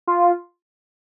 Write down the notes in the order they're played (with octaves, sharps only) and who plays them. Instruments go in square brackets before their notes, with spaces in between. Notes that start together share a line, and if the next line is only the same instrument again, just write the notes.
[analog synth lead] F4